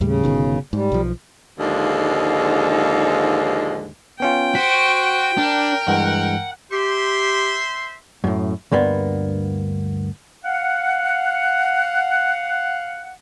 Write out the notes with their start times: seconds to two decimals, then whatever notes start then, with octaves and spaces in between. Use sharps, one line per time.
0.01 D#2 A2 C#3 G3
0.24 G1 B2 D#3
0.73 G#2 G3
0.92 B1 F3
1.59 D#2 G#2 D3 F3 G#3
4.20 B3 C#4 F4 G5
4.55 F#4 C5 B6 D7
5.38 D4 A#4
5.88 G2 E3 G#3 F#5
6.72 G4 C5 E5 C6
8.24 F#2 A2
8.72 D2 G2 A#3 B3
10.44 F5 F#5